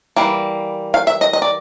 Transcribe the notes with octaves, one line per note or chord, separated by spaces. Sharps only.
E3 G3 A#3
F5
E5
D#5
D#5
D5